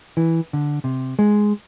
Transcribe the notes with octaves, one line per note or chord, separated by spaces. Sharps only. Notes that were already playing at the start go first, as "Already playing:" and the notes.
E3
D3
C3
G#3